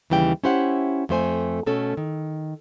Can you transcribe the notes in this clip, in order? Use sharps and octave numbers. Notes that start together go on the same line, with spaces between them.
D#2 C#3 E3 G3 G5
C#4 E4 G4 C5 E5 F#5
F2 A3 C5 G#5
B2 A3 C#4 A4
D#3